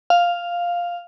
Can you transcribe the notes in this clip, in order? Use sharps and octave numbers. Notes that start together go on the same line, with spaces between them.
F5